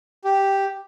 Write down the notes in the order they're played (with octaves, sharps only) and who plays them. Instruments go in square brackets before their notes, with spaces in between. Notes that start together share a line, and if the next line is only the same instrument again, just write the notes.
[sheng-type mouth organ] G4